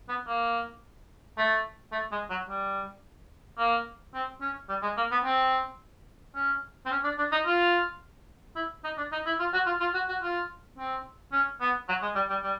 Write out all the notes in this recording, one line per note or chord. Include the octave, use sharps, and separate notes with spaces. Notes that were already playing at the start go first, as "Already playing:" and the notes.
B3
A#3
A3
A3
G#3
F#3
G3
A#3
C4
C#4
G3
G#3
A#3
B3
C4
C#4
C4
C#4
D4
D4
D#4
F4
E4
D#4
D4
D#4
E4
F4
F#4
F4
F4
F#4
F#4
F4
C4
C#4
B3
F#3
G#3
G3
G3
G3